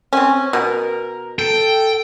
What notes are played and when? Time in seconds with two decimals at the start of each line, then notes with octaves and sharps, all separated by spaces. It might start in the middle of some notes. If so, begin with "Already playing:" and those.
0.13 C4 C#4
0.53 B2 A#4
1.39 A4 G5